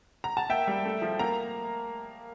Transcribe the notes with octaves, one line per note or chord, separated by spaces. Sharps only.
A#5
A5
A#3 E5 G5
G3
A3
F3
A#3 A#5